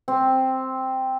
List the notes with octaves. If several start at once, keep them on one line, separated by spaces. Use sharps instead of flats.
C4